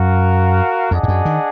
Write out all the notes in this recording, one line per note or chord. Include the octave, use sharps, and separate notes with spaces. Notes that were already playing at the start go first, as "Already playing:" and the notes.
Already playing: F#2 F#4 A#4 F5
F2 D4 G#4 D#5 F#5
G#2
F#2
D#3